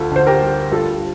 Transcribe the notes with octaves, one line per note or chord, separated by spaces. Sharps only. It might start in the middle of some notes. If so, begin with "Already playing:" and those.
Already playing: D2 F4 A4
D3 C5
G4 A#4
G3
G2 F4 A4